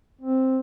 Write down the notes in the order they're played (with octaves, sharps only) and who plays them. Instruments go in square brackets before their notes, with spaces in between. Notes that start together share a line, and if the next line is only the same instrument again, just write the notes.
[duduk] C4